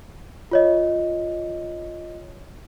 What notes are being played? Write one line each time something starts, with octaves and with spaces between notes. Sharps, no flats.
F4 C#5 D#5